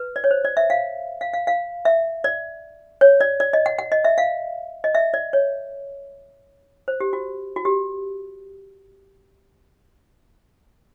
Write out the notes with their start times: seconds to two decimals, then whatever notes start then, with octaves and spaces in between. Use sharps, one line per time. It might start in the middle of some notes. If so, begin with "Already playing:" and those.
Already playing: B4
0.16 D5
0.24 C#5
0.31 C5
0.45 D5
0.57 E5
0.70 F5
1.21 F5
1.33 F5
1.47 F5
1.85 E5
2.24 D5
3.01 C#5
3.21 D5
3.40 D5
3.53 D#5
3.66 F#5
3.79 F#5
3.92 D#5
4.05 E5
4.18 F5
4.84 D#5
4.95 E5
5.14 D5
5.33 C#5
6.88 C5
7.00 G4
7.13 F#4
7.56 F#4
7.65 G4